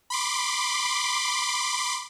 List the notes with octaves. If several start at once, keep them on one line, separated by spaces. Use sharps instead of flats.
B5 C6 D6